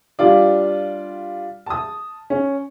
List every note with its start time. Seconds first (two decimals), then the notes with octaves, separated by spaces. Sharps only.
0.19 G3 D4 F4 D5
1.66 A5 D#6
2.30 C#4